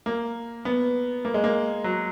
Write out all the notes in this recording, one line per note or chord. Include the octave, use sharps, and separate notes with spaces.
A#3
B3
A#3
G#3
A#3
F#3